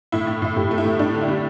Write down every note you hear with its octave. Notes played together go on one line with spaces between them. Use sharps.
A2 E4
A2
A2 E4
A2 G4
A3
E4
A2
G3 D4
D3
E4
G3